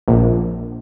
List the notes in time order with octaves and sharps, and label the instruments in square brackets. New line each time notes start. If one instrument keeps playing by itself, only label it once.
[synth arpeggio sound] A#1